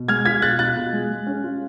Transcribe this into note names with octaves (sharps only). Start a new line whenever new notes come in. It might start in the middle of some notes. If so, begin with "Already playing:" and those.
Already playing: B2
G#3 F6 G#6
F4 G#6 B6
B2 F#6 A6
F4 F#6 A6
B2
G#3
G#3
C#4
F4